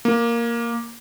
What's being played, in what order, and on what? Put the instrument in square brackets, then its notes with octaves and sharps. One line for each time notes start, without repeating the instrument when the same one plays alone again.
[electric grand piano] A#3